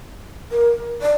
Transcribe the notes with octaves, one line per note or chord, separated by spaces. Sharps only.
A#4
D5